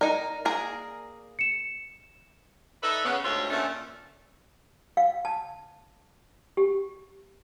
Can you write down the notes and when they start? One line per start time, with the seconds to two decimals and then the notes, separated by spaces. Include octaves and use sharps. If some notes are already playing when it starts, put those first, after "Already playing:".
0.01 D#4 A#4 D5
0.45 A#3 G#4 A#4
1.39 C#7 E7
2.83 D#4 A4 B4 D5 E5
3.04 C#3 B3
3.23 D2 G#2 F4 C#5 E5
3.50 A#2 D3 A3 C#4 D4
4.97 F5
5.25 A5
6.57 G4